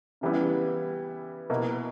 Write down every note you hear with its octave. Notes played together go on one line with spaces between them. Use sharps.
C#3 E3 G3 B3 E4
B2 A#3 E4